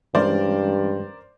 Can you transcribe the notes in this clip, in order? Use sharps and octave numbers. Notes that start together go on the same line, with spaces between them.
G2 E3 G#3 C#4 A#4 C5 D5